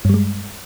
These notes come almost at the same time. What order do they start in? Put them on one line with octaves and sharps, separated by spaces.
G2 G3 G#3